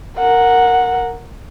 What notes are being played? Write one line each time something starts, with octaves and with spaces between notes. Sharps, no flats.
A#4 F#5